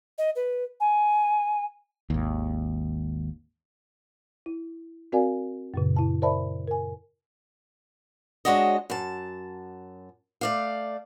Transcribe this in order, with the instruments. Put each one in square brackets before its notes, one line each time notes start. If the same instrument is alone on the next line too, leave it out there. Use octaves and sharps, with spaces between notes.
[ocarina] D#5
B4
G#5
[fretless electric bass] G#1 D#2
[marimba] E4
C4 F#4 A#4 D5 F5 G#5
F#2 A#2 C#3
E4 A5
A#4 C5 D5 E5 A5 B5
A#4 G#5
[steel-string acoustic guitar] G#3 D4 F#4 C#5 D#5
F#2 A5
A3 D5 F5